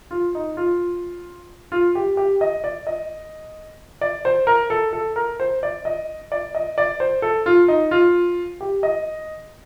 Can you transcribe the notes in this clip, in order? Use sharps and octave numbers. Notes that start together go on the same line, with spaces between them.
F4
D#4
F4
F4
G4
G4
D#5
D5
D#5
D5
C5
A#4
A4
A4
A#4
C5
D5
D#5
D5
D#5
D5
C5
A4
F4
D#4
F4
G4
D#5